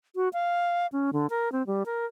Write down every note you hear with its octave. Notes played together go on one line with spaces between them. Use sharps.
F#4
F5
C#4
D3
A#4
C4
G3
A#4